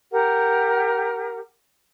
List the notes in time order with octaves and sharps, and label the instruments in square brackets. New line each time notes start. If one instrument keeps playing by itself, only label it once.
[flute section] G4 A#4 F#5